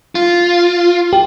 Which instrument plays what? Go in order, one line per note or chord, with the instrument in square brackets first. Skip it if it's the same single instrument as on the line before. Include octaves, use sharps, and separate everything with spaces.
[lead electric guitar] F4
[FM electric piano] G4